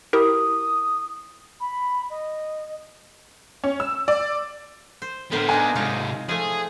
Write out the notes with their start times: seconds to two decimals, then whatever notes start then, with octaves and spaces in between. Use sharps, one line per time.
0.13 E4 G4 A#4 D#6
1.60 B5
2.09 D#5
3.64 C#4
3.80 E6
4.08 D5
5.02 C5
5.32 A2 D3 B3 A#4 C5
5.49 G#3 D4 D#4 G#5
5.75 G#2 C3 D#4 F4 C#5
6.29 F3 A3 G#4